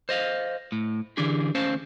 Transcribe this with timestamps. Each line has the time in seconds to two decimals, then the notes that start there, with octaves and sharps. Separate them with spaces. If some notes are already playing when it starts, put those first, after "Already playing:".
0.09 C5 D#5 F5
0.72 A2
1.17 D3 E3 D4 G4 G#4
1.55 D2 C#4 C5 F5 A5